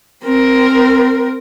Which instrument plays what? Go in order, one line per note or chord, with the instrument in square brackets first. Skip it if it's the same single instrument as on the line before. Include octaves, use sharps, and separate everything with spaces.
[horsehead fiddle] C4 A#4